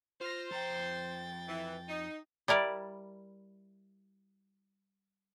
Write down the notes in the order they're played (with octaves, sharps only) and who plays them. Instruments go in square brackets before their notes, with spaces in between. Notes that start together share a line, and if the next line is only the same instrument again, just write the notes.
[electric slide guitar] F4 [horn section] C5 [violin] F6 A#6
[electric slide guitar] F2 A#5 [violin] G5 A6
[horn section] E3
D#4
[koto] G3 E4 A#4 D5